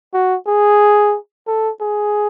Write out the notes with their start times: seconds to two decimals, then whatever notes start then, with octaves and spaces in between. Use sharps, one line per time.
0.13 F#4
0.46 G#4
1.47 A4
1.81 G#4